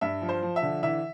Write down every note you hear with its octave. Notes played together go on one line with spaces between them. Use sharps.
G2 E5
F3
C5
F3
E5
D3
E3 E5